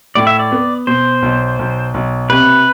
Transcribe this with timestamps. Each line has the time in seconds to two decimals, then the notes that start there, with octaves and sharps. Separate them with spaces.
0.15 A2 D5
0.27 E5
0.39 D5
0.52 B3
0.87 B2 C5
1.22 B1
1.59 B1
1.94 B1
2.29 C3 B4